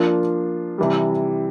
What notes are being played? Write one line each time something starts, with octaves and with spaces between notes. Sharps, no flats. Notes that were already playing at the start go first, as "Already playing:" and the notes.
Already playing: F3 A#3 D4 F4
C3 E3 G3